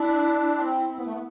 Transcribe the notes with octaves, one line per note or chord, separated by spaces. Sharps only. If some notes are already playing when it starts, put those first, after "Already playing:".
Already playing: D4 E4
C4
C4
B3
A3
B3